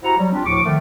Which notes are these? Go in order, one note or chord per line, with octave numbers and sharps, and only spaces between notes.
E4 F#4 G4 C5 F#5 A#5
F#3 G3
C4 D4 F4 G4
D2 A2 F3 C#6 D6
D3 D#3 F3 A3